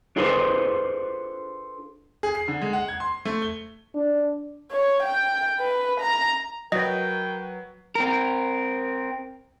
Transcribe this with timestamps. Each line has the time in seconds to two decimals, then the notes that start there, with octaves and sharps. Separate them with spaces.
0.16 D4 F4 G#4 A4 B4 C5
2.23 G#4
2.35 C7
2.48 D3
2.62 G#3
2.73 F#5
2.88 G#6
3.00 C6
3.25 A3
3.42 G7
3.94 D4
4.71 C#5
5.03 G5
5.60 B4
6.00 A#5
6.72 F#3 A#4 B4 D#5 G5
7.95 C4 A#4